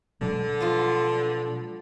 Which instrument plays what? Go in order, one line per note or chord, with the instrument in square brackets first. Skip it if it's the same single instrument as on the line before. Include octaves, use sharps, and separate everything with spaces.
[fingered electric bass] B2 F#3 G#3 [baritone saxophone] D3
[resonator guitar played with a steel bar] F3 B3 F4